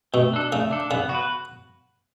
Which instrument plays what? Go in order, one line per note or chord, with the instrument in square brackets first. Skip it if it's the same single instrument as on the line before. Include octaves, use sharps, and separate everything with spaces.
[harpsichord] B2 [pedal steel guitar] A3
[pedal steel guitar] D4 A4
[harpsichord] C#3 [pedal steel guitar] A3
[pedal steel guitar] D4 A4
[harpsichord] C#3 [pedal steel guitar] B3
[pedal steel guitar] F#4
B4